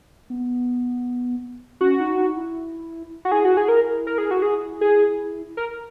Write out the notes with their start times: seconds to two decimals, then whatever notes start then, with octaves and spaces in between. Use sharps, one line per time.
0.30 B3
1.81 C#4 F#4
1.99 D#4
2.18 D#4
2.37 E4
3.25 F#4
3.31 E4 G#4
3.45 F#4
3.57 G#4
3.68 A#4
4.07 A#4
4.18 G#4
4.31 F#4
4.42 G#4
4.81 G#4
5.57 A#4